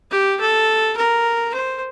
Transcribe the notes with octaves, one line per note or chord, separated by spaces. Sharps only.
G4
A4
A#4
C5